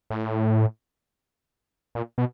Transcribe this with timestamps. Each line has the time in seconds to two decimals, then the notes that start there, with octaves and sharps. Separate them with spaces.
0.10 A2
1.95 A#2
2.18 B2